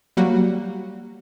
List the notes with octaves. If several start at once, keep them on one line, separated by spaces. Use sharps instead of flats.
F#3 G3 A#3 F#4